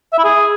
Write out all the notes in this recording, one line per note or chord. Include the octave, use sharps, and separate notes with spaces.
E5
E4
G#4